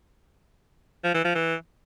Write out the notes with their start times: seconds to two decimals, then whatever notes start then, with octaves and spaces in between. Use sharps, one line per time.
1.04 F3
1.14 E3
1.25 F3
1.35 E3